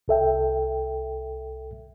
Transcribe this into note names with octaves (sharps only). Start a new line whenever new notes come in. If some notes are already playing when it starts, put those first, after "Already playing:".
C2 A4 E5 G5